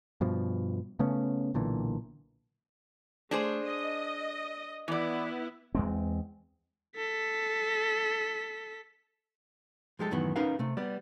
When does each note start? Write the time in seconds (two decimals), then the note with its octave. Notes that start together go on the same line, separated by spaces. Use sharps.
0.21 G2 B2 F3
0.99 C#3 A3 B3 C#4
1.54 B1 A#2 D3 E3
3.31 A3 D4 G#4 C5
3.66 D#5
4.88 E3 B3 E4 D5
5.75 E2 G#3 C4
6.96 A4 B6
9.99 F3 G#3 G4 A4
10.11 F#2 A2 D#3 E3 B3
10.36 C#4 D#4 G4 A#4 B4 F5
10.59 C3 A3
10.77 G3 B3 D5